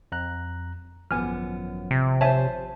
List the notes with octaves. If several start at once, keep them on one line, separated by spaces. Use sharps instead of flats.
F2 A#5 F#6
G#1 F#2 F3 B3 G#5 F6
C3
C5 C#5 E5 G#5 A5